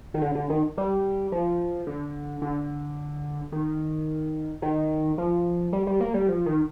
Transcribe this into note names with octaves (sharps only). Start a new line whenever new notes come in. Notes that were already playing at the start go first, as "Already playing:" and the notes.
D#3
D3
D3
D#3
G3
F3
D3
D3
D#3
D#3
F3
G3
G3
A#3
G3
F3
D#3